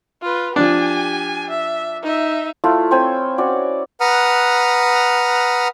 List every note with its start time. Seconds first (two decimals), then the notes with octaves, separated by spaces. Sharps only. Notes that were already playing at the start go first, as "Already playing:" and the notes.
0.22 F4 B4
0.56 F3 D4 G4 G#5
1.50 E5
2.03 D#4 E5
2.64 A3 E4 F4
2.91 C4 C#5 G5 G#5
3.38 C#4 F#4 D5
4.00 B4 F#5 A#5 D#6 F6